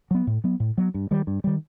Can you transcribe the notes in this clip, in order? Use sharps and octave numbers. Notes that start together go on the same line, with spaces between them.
F#3 B3
A2
F#3 B3
A2
F#3 B3
G2
D#3 G3
G2
D#3 G3